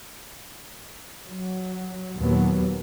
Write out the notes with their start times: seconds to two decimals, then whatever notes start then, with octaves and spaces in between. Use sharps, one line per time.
1.26 F#3
2.17 D#2 A#2 F#3 B3